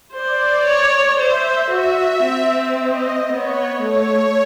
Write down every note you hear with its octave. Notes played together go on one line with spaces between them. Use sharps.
C5 D5
C#5
C5 E5
F#4 E5
C4
D#5
B3 C#5
A3 C#5